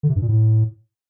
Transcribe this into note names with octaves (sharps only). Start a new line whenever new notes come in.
D3
C3
G2
A#2
A2